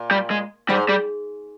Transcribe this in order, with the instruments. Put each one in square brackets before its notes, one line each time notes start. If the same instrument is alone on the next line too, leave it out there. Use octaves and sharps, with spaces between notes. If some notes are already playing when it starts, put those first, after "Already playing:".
Already playing: [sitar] A#2
[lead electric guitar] G3
G#3
[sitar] G#2 [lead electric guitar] G3
[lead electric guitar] G3